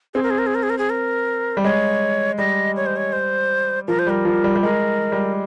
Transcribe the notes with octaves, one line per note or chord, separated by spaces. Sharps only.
C4 G#4
A#4
G#4
A#4
G#4
A#4
G#4
A#4
G#4
A#4
G3
G#3 C#5
G3 D#5
C#5
C5
C#5
C5
F3 A#4
C5
G3 A#4
F3
G3
G3
G#3 A#4
G3